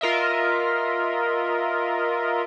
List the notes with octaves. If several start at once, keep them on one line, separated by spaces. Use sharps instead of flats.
F4 A#4 D#5 E5